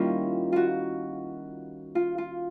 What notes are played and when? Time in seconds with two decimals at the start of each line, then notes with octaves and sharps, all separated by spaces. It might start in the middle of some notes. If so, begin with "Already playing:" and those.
Already playing: D#3 G3 A#3 C#4 E4 F4
0.52 F4 F#4
1.95 F4
2.18 F4